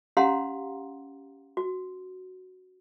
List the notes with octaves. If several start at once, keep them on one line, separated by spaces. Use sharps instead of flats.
C#4 G4 F5 F#5 A#5 C6
F#4